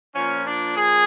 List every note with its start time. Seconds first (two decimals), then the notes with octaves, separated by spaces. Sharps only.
0.16 A#2 F3 C#4
0.45 D4
0.76 G#4